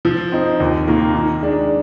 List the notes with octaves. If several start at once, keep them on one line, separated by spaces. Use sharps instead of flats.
F3
C4 D#4
D#2
D#3 A#3 F4
D#3
G#3 D4